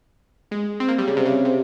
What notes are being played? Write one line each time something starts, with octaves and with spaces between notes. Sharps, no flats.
G#3
C4
A#3
G3
C#3
C3
C#3
C3